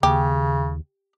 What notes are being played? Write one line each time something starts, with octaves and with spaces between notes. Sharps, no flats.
D#2 C#3 G4